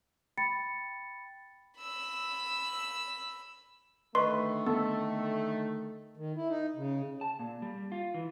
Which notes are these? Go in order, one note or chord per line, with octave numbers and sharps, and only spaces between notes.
G5 B5 A6 C#7
B5 E6
D3 D#3 A3 B4 D#5 C6 C#6
B3 A4
D#3
E4
D#4
C#3
A5
A#2
G3
F4
E3